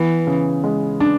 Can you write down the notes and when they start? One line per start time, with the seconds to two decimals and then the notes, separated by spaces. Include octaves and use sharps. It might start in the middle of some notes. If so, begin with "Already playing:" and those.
Already playing: E3 B3
0.27 C#3
0.64 G#3
1.00 D4